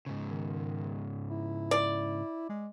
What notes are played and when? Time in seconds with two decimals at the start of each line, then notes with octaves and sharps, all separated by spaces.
0.06 G#2 C#3
0.30 D#3
1.30 E4
1.71 D5
2.49 G#3